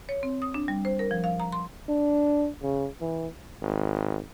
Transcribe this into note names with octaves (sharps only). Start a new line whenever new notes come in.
C#5
C4
D#6
D4
G3
C5
A#4
F3
F5
A#5
C6
D4
C#3
E3
G#1